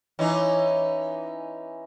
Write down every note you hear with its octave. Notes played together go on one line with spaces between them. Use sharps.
E3 C#4 D#4